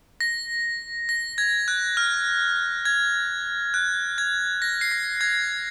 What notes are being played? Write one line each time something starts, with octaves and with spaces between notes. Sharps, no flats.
A#6
A#6
G#6
F#6
F6
G#6
F#6
G#6
A#6
C7
A#6
G#6